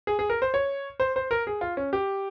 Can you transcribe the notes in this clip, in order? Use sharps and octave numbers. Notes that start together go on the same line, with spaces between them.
G#4
G#4
A#4
C5
C#5
C5
C5
A#4
G#4
F4
C#4
G4